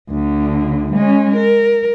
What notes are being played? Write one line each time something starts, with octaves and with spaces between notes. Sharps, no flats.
D2 D3
G#3 C#4
A#4